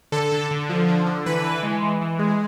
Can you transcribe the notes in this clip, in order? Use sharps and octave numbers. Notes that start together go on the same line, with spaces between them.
D3 A4
D3
D3
F3
D3
D3
E3 B4
E3
G#3
E3
E3
G#3